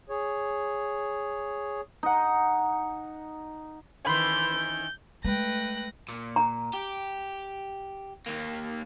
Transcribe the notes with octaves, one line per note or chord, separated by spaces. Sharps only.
G#4 C#5
D#4 F#5
D#3 E3 B5 C6 G6
G#3 A3 B4 G5 F#6 A#6
A#2
A#5
G4
D#2 A#3